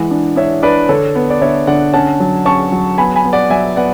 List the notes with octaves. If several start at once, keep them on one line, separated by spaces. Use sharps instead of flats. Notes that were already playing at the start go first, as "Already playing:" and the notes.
Already playing: E3 G#3 F#5
D4
D4 C#5 E5
D4 B4 D5
D3 A4 C#5
B3
D5
D3 C#5 E5
D3 D5 F#5
C#4 F#5 A5
F#3
C#4 A5 C#6
F#3
B3 G#5 B5
G#5 B5
B3
D5 F#5
F#3 E5 G#5
B3 D5 F#5